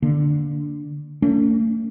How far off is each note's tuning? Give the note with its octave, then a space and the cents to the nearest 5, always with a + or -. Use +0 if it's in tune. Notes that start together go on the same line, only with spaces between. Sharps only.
D3 +0 A#3 +0
A3 +35 C#4 +40